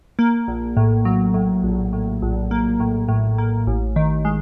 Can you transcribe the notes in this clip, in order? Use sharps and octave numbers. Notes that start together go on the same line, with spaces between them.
A#3
A#1
A2
F#3
A2
A#1
A2
A#1
A#3
A2
A2
A#3
A1
D#3
G#3